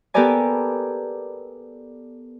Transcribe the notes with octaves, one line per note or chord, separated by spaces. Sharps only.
B3 G4 A4 A#4 D5 G#5